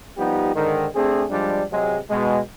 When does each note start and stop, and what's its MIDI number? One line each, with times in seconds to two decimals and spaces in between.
0.18 0.55 53
0.18 0.55 55
0.18 0.55 59
0.18 0.55 63
0.18 0.55 67
0.55 0.86 44
0.55 0.86 50
0.55 0.86 51
0.95 1.24 57
0.95 1.24 60
0.95 1.24 62
0.95 1.24 68
1.31 1.62 53
1.31 1.62 55
1.31 1.62 56
1.31 1.62 62
1.72 1.98 48
1.72 1.98 54
1.72 1.98 56
2.10 2.39 47
2.10 2.39 56